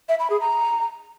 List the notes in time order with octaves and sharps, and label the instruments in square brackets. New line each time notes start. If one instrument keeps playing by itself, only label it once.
[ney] E5
B5
G#4
A#5